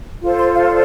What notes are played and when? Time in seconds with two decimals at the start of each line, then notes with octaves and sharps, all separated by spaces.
0.21 F4 A4 C5
0.37 C6
0.53 F5
0.69 D5